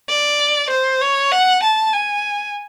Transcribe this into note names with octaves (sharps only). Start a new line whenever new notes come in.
D5
C5
C#5
F#5
A5
G#5